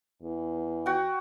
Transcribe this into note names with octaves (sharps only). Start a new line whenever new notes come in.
E2
F#4 G5